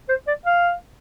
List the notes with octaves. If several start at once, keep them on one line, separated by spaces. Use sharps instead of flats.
C5
D5
F5